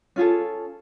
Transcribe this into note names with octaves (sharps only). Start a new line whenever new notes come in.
C#4 F4 G#4 A4